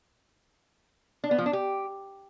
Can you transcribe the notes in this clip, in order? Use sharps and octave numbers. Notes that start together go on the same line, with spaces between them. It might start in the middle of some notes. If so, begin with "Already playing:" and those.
D4
B3
F3
D4
G4